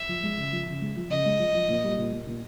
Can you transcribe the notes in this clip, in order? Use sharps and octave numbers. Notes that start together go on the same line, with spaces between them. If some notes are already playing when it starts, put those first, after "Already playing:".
Already playing: E5
F3
G#3
C#3
F3
C#3
G#3
F3
C#3 D#5
G#3
F3
F3
A#2
G3
A#2
A#2
A#2